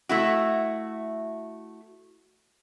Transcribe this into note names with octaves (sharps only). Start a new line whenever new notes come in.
A3 E4 F#4